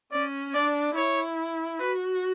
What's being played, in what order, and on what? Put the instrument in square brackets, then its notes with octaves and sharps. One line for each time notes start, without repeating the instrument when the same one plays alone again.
[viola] C#4 [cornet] D5
[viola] D4 [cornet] D5
[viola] E4 [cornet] C#5
[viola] F#4 [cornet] B4